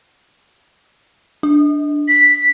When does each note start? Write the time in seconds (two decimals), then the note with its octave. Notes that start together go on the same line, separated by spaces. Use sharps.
1.43 D4
2.08 B6